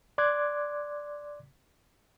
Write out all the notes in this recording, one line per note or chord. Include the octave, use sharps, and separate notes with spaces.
D5 C6 D6 F#6 G#6